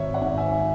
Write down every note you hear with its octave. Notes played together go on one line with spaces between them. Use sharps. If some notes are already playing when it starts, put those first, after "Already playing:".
Already playing: G#1 C#5 E5
D5 F#5
G#2
E5 G#5